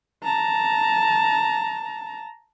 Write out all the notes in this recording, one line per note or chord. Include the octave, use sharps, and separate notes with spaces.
A5 A#5